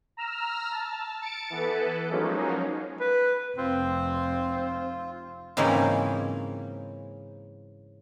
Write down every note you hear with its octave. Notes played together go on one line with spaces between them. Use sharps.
A#5 E6 F6
A5
A6 C#7 D7
E3 B3 A4 B4
F3 F#3 G#3 A#3 C#4 D#4
B4
F1 C4 F4
G#2 C#3 E3 A#3 C4 C#4